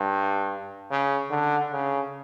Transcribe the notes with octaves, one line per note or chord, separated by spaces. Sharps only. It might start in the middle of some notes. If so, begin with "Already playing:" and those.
Already playing: G2
C#3
D3
C#3